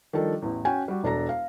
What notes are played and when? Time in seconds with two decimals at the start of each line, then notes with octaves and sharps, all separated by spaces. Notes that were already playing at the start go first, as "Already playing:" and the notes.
0.13 D#3 F3 G3 D4 A4
0.42 A1 E2
0.65 C#4 F#4 G5 G#5
0.88 G3 F#4
1.03 E1 D4 A4 A#5 A#6
1.29 F5